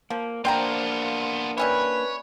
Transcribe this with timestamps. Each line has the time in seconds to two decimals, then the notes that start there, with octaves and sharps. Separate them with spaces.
0.10 F3 A#3
0.45 A#3 B3 D4 F4 C5 G5 A#5
1.58 G3 C#4 E4 B4 C#5